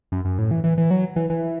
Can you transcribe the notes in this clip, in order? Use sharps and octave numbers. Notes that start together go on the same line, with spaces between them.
F#2
F#2
A2
E3
E3
E3
F#3
E3
E3